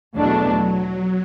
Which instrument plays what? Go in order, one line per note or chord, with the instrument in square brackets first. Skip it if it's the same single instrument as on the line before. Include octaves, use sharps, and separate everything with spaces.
[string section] E2 B2 A3 D4 [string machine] F#3